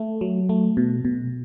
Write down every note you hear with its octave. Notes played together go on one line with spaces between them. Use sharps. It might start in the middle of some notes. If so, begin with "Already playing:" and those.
Already playing: A3
F#3
A3
B2
B2